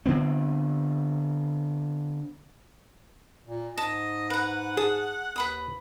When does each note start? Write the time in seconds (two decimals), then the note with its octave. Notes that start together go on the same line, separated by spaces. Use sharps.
0.06 D3 B3 C4
3.47 A#2
3.77 G#2 D#5 A5
4.30 B4 F#5 A#5
4.77 G#4 A5 D#6
5.36 D#2 B4 B5 D#6